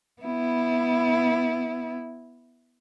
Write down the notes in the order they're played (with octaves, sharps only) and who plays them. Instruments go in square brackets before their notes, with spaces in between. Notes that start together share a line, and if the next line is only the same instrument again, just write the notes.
[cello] B3 E4